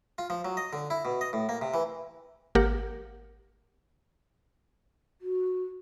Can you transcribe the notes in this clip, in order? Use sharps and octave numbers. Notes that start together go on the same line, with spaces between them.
F4
F3
F#3
D#5
D3
E4
B2
D#5
A2
A#3
C3
E3
G#1 A#3 G4 A#4 F#5
F#4